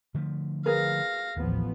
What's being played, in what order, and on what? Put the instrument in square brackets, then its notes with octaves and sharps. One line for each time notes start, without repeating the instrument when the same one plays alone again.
[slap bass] D3 F3 A3
[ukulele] G#4 A#4 B4 [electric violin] F5 A#6
[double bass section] A1 F3 B3 [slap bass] D#2